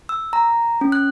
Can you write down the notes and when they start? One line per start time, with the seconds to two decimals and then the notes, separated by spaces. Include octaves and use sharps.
0.09 E6
0.33 A#5
0.81 C#4
0.92 F#6